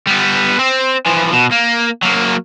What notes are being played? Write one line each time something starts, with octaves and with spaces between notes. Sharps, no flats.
G3 B3
C4
E3 F3
B2
A#3
F#3 A#3